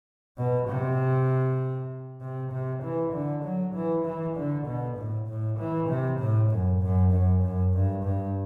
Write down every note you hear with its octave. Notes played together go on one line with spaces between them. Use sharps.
B2
C3
C3
C3
E3
D3
F#3
E3
E3
D3
B2
A2
A2
E3
C3
A2
F#2
F#2
F#2
F#2
G2
G2